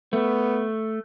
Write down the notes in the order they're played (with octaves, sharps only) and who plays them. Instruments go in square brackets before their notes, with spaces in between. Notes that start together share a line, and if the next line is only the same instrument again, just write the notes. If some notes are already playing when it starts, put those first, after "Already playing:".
[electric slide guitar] A3 [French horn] B3